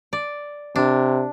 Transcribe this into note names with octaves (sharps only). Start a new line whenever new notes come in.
D5
C3 D4